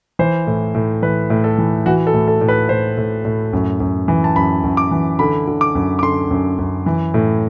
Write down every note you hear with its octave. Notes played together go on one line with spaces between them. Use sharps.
E3 C5
A2
A2
E3 B4
A2
A4
E3
E3 F#4
A4
A2
A4
A2
B4
A2 C5
A2
A2
F#2
F#2
E3
A5
F#2 B5
F#2
D6
E3
D3 B5
D3
D6
F#2
D6
D3 C6
F#2
F#2
E3
A2